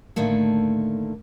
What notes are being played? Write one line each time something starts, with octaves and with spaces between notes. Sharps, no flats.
A2 D3 D#3 A3 A#3